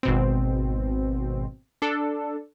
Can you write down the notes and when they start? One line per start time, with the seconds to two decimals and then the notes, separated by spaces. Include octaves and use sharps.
0.03 G#1 B2 C4
1.82 D4 A4